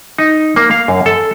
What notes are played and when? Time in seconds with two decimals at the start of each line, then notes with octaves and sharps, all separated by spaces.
0.18 D#4
0.56 A#3
0.71 F5
0.88 F#2
1.06 A4